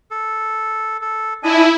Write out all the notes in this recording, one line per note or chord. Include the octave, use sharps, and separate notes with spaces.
A4
A4
D4 E4 D#5 G#5